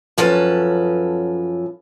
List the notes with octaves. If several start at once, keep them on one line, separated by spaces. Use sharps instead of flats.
F#2 F3 C#4 A4 B4